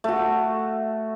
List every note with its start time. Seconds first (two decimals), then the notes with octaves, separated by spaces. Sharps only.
0.04 A3 F#4